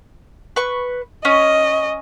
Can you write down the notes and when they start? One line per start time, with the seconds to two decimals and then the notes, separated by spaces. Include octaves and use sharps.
0.56 B4 C#6
1.25 C#4 D#5